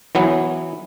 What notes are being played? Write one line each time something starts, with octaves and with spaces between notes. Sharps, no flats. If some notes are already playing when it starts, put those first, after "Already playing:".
E3 F#3 B3